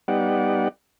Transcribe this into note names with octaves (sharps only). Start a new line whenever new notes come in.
G3 B3 D#4 G4 D5 F#5